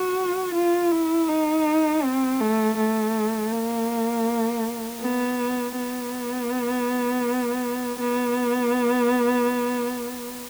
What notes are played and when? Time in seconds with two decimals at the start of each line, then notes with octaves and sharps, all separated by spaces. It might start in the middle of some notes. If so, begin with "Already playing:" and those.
Already playing: F#4
0.54 F4
0.91 E4
1.28 D#4
2.03 C4
2.40 A3
2.77 A3
3.52 A#3
5.02 B3
5.77 B3
8.00 B3